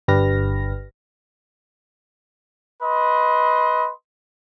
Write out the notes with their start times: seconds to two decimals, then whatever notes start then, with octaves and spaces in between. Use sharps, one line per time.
0.08 G1 D4 G4 B4 F6 A#6
2.82 B4 D#5 C6